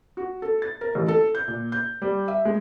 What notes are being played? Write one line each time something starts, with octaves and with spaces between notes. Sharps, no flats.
F#4
A4
A6
A#4
A1
A4
G6
A#2
G6
G3
E5
G#3